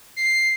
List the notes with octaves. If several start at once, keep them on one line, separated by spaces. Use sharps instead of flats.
C7